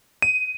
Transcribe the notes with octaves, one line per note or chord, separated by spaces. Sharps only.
D#7